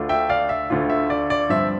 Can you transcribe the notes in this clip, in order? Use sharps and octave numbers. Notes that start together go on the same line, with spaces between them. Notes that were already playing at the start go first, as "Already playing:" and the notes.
Already playing: D2 D3 A3 D4 F4
E5 G5
D5 F5
E5
D2 D3 A3 D4 F4
E5
D5
D5
G2 F3 C4 E5